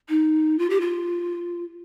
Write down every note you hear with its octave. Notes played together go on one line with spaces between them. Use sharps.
D#4
F4
G4
F4